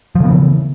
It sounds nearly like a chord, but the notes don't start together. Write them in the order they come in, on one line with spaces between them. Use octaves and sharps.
F3 C#3 B3 E3